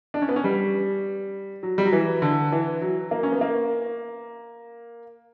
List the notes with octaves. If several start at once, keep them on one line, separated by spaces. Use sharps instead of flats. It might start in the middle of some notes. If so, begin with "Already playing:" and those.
D4
C#4
B3
C#4
G3
F#3
G3
F#3
E3
D3
E3
F#3
A#3
C#4
B3
A#3